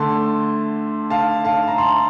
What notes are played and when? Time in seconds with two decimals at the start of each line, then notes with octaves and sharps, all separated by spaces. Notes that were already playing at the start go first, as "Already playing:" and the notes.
Already playing: D3 A3 A5 C6
1.10 F5 A5
1.45 F5 A5
1.68 A#5
1.78 A5 C6